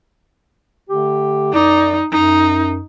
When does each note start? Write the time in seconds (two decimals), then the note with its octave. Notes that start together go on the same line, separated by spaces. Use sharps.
0.90 D3 A3 G4
1.54 F#2 D#4 D5
2.12 F#2 D#4